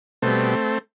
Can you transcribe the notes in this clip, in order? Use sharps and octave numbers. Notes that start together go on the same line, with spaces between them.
B2 G3 A3 C4